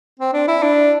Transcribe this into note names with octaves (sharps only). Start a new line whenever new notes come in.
C4
D4
E4
D4